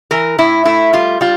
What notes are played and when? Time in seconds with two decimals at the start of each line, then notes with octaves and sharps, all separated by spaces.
0.11 E3 A#4
0.38 A2 E4
0.65 A3 E4
0.93 G3 F4
1.21 G3 F4